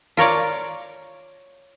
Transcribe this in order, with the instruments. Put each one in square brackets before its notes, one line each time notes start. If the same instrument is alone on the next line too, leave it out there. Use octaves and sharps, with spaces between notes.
[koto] F4 A#4 C#5 D5